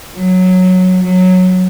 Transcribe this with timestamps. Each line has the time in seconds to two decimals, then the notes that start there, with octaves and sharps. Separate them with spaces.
0.15 F#3
1.03 F#3